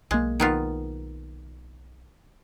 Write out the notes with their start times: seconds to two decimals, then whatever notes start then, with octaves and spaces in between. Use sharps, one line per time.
0.11 B1 G#3 A#3
0.40 D#3 B3 F4